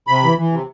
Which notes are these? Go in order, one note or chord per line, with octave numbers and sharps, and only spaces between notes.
C3 B5
E3
E3
C3